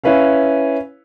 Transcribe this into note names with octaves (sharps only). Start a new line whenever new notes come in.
C#4 E4 B4 C#5 F5